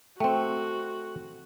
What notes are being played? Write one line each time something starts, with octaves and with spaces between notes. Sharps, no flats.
A3 C4 F#4 G5